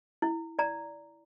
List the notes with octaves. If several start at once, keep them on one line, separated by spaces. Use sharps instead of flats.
E4
D5 A#5